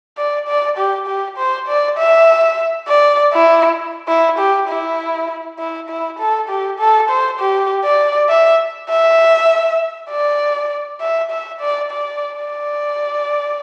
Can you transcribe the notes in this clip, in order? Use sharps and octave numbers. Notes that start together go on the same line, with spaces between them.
D5
D5
G4
G4
C5
D5
E5
D5
E4
E4
G4
E4
E4
E4
A4
G4
A4
C5
G4
D5
E5
E5
D5
E5
E5
D5
D5
D5